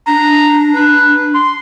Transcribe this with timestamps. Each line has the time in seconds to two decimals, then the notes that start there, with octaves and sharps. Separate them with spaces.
0.07 D4 A#5
0.75 B4
1.34 C6